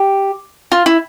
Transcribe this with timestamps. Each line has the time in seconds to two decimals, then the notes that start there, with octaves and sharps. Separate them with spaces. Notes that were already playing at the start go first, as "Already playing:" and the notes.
Already playing: G4
0.72 F4
0.86 E4